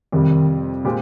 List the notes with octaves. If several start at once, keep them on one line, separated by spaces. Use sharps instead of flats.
F2 C3 D#3 G3
A#2 G#3 C4 G4